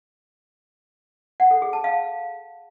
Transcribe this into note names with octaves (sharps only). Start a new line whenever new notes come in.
F#5
A4
G#4
A5
F5